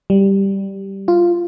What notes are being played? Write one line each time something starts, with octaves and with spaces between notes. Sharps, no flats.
G3
F4